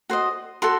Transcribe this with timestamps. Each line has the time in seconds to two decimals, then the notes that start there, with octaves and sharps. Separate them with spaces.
0.10 F#4 C5 D#5
0.62 F#4 A4 C6